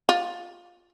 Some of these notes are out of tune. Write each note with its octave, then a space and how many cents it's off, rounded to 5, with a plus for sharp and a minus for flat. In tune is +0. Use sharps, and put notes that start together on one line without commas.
F4 +15